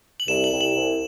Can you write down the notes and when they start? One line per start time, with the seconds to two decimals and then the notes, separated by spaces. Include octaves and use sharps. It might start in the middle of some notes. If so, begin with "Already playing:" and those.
0.20 F#7
0.28 C2 E7
0.44 F#7
0.52 C2
0.61 F#7
0.76 C2